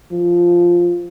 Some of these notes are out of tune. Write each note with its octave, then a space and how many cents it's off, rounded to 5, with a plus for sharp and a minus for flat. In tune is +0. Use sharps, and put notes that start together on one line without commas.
F3 +0